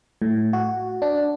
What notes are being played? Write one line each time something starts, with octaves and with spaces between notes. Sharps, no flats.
A2
F#4
D4